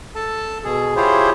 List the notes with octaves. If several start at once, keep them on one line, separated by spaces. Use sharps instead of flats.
A4 A5
B2 G#4
E4 F4 G4 G#4 C5 C#5